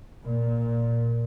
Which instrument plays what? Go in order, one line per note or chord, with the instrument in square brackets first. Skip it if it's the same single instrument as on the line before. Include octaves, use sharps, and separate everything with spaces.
[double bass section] A#2